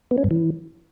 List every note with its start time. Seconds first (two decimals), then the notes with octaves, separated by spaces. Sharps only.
0.11 B3
0.18 C#4
0.24 G2
0.31 E3